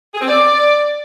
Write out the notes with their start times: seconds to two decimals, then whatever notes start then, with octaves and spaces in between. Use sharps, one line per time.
0.14 G#4
0.21 C4
0.28 D5